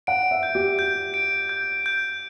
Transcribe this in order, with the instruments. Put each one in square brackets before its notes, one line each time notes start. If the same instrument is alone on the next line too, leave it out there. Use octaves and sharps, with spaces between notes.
[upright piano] F#5 [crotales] D7
[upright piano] E5
[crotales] G6
[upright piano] G4
[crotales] G6
D7
G6
G6